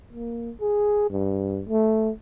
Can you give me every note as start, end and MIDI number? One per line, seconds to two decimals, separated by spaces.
0.13 0.52 58
0.61 1.05 68
1.10 1.63 43
1.68 2.10 57